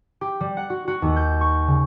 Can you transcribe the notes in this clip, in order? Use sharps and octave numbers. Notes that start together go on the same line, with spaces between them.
G4
G3
F#5
F#4
F#4
D#2
G6
C#6
C#3